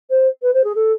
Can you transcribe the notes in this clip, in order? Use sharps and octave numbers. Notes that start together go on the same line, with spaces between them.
C5
B4
C5
G#4
A4